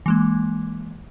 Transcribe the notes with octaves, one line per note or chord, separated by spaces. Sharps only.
E3 G#3 A#3